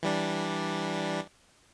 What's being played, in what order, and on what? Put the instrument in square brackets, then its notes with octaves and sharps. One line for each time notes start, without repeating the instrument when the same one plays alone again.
[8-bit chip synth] E3 G3 D4